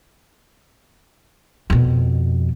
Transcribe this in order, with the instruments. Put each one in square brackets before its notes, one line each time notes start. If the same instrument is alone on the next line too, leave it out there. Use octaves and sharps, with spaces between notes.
[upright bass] F2 B2